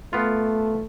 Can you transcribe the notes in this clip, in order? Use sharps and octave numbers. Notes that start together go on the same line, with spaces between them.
A3 B3 F4